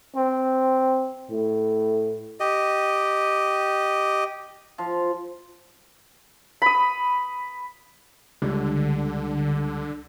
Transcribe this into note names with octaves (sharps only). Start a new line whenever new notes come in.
C4
A2
G4 D#5
F3
B5 D#6
C#2 D3 G3